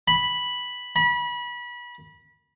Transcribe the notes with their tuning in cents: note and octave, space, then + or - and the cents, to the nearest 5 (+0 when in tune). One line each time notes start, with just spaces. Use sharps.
B5 -5
B5 -30